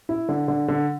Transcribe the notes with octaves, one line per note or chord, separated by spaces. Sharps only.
E4
D3
D3
D3